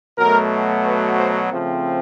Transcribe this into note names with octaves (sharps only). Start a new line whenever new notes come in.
B2 F#3 A3 A#4
B4
C5
C#3 F3 A3 C4